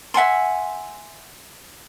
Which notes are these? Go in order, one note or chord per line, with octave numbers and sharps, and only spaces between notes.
E5 F#5 G#5 C6